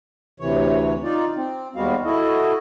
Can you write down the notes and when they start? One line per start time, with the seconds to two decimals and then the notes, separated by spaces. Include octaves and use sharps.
0.40 D2 C3 E3 C#5
1.03 D#4 F4 D5
1.36 C4
1.76 D#2 G3 G#3 B3 F#4 F5
2.05 E4 F#4 A4 D#5